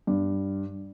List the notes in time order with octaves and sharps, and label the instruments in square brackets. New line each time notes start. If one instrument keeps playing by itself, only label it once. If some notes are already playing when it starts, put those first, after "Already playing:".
[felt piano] G2